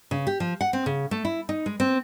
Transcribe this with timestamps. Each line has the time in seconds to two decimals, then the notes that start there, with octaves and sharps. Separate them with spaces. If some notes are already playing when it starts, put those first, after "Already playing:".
0.11 C#3
0.27 G4
0.40 F3
0.61 F#5
0.73 C4
0.86 C#3
1.11 A3
1.25 E4
1.49 D#4
1.66 G#3
1.80 C4